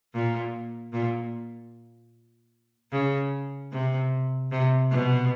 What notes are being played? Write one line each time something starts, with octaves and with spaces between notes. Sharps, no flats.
A#2
A#2
C#3
C3
C3
B2